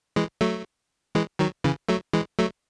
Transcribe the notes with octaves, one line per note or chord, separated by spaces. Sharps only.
E3 G#3
F#3 A3
E3 G#3
D#3 F#3
C#3 E3
F#3 A3
E3 G#3
F#3 A3